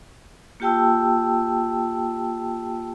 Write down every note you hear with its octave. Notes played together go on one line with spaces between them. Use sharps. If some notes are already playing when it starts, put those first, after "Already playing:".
A#3 F4 G4 G5 A5 E6